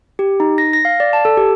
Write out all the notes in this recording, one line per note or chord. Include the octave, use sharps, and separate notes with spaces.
G4
D#4
A#6
A#6
F5
D5
A5
A4
G4